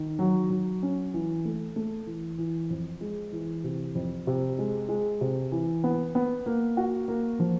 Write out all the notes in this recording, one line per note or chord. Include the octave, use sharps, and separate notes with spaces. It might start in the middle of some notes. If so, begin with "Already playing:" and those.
Already playing: D#3
F#3
F#3
C#4
E3
A3
A3
E3
E3
F2
G#3
E3
C3
F2
C3
G#3
G#3
C3
E3
B3
B3
A#3
F#4
A#3
F3